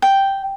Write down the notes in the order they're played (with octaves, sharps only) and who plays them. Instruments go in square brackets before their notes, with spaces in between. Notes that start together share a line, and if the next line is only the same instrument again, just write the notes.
[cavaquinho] G5